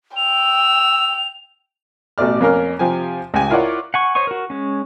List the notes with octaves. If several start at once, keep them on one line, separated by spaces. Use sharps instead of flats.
G5 E6 F7
A1 B2 A3 D5 F6
F2 A#3 C#4 A#4 F6
C3 F3 G4 G#5
C#2 G4 G#5
E4 F4 A#4 C#5 D5 F#5
F#5 G#5 C#6
C5 C#5 D#5 C#6
F#4 A#4
G#3 C#4